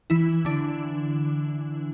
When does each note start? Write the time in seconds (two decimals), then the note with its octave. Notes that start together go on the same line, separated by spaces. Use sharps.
0.10 E3 E4
0.45 D3 D4